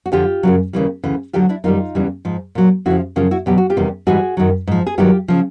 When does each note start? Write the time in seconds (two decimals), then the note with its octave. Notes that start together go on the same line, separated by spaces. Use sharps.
0.06 F#4
0.12 F2 D3 F3 F4 G4
0.43 F#2 C#3 F#3
0.73 D#2 C#3 E3 G3
1.04 D2 C#3 E3
1.33 D2 D3 F#3 F4 G4
1.49 D4 E4
1.64 F#2 D#3 G3 D#4 F4
1.95 E2 C#3 E3 G3
2.25 G#2 F3
2.55 A#2 F#3
2.86 F2 C#3 F3 E4 F#4
3.16 F#2 C#3 F3 F4 G4
3.31 E4 F#4
3.46 E2 B2 F#3 G4
3.58 F#4
3.70 F4 G4
3.77 E2 C3 D#3 G3
4.07 G#2 E3 G3 F#4 G#4
4.37 F#2 D#3 F#3
4.67 G#2 F3
4.87 G#4
4.98 G2 D#3 F#3 F4 G4
5.28 C#3 F3